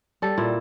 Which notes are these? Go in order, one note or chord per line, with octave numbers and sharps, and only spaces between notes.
G3 A4
A#2 E4